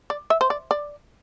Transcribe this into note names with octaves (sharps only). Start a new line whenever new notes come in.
D5
E5
C5
D5
D5